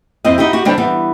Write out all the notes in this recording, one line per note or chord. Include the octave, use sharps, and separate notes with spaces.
F2 C4 E4 D#5
D#4 E4 F#4 G4
F#4 G4
D3 G3 D4 C5 C#5 G5
E3 G3 B3